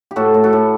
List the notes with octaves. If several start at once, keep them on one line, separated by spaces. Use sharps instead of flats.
G4
A2 F#4 A4
A2
F#4 A4
A2